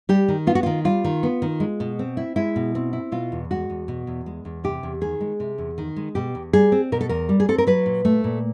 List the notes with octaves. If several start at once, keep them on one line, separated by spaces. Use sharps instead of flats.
G3 G4
D#3
B3 F4
F#4
D#3 F4
G3 F4
D#3
B3
D#3
G#3
B2
C4
E4
G#3 E4
B2
C4
E4
B2 F4
E2
G#3 F#4
E2
B2
E2
G#3
E2
C3 G4
E2
D#3 G#4
G#3
C3
E2
D#3
G#3
B2 G4
E2
G3 G#4
C4
B2 A#4
A4
E2 A#4
G3
G#4
C4 A4
A#4
F#3 B4
A#2
A3
A#2